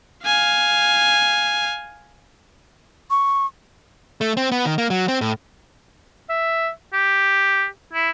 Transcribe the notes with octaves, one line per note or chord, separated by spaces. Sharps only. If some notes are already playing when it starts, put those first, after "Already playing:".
F5 G#5
C#6
A3
C4
B3
D#3
A#3
F#3
C4
A2
E5
G4
E4